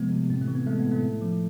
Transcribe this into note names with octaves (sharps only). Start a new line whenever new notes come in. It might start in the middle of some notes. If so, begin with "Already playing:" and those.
Already playing: C3 F3 G#3 A3 B3
C3
A2 C4
A3
E3
B3
G#3 A3
B3
A2
A3
A2
F3